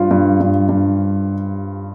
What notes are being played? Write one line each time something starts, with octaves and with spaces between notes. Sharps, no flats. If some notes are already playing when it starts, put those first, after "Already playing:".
Already playing: G2 F4
G2
G2
G2